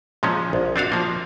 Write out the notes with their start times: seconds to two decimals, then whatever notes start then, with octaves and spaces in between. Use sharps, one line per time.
0.23 A#2 F3 G#3 C#4
0.53 A#1
0.76 C4 D4 F#4 F5
0.92 F3 A#3